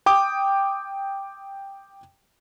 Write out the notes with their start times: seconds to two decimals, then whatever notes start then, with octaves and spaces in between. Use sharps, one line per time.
0.06 G5 D6 D#6